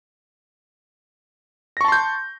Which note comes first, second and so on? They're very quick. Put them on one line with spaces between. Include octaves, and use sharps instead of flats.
A#6 C#6 A5 C6 G6